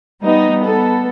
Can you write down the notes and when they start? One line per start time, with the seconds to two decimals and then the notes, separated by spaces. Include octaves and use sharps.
0.20 G3 B3 D#4
0.64 B3 A4